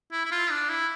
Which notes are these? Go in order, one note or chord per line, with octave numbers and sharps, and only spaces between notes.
E4
E4
F4
D4
E4